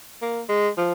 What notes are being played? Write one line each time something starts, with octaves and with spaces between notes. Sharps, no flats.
A#3
G#3
F3